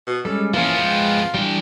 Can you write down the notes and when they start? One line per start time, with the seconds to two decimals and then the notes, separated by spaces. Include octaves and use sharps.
0.07 B2
0.25 G3 G#3 C#4 A4
0.54 E3 F3 A#3 B3 C#4 F4
0.79 G#3 B4 G5
1.34 E3 G3 D4 G5